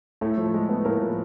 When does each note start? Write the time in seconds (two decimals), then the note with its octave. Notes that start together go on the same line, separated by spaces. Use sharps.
0.21 A2 A3 A4
0.37 F3
0.54 G#3
0.69 B3
0.85 A2 A#3 A#4
1.01 F3